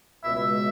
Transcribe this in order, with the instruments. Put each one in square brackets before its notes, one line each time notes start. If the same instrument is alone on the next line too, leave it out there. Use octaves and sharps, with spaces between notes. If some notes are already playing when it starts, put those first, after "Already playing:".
[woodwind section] C#2 B2 G#3 E5